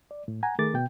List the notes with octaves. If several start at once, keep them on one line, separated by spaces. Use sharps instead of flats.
D5
A2
F#5 G#5 A#5
D#3 A3 G#4 A#4 D6 A6
B2 G5